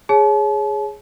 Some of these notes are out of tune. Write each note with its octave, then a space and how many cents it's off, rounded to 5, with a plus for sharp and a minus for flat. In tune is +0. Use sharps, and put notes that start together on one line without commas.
G#4 +0 C#5 +0 A5 -40